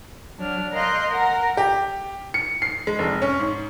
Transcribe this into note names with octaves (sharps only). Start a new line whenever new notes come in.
F#3 D4 F6
A#4 D#5 F5 C6 F#6 G6
A#4 F#5 A#5
G4
C#7
C7
G#3
F1
C#4
G#2